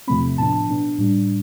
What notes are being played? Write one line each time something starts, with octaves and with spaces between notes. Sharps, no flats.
E2 C3 F3 A3 C4 B5
A2 F3 B3 D4 A5
A5
B2 B3 D4
A2 G3 D4